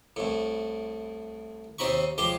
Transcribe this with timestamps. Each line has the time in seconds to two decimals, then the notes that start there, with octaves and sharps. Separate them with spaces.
0.16 C2 A2
1.79 D#2 C4 D#4 B5 C#6
2.18 C#2 F3 G4 C6